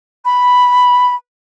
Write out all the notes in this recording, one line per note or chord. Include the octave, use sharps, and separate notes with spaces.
B5